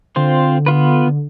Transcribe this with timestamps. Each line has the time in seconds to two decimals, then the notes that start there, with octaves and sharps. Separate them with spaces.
0.16 D3 C4 F4 C5
0.66 B3 F4 B4
1.06 D3